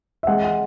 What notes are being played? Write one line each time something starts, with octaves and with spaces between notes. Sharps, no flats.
E5
G#3 F#5
F#5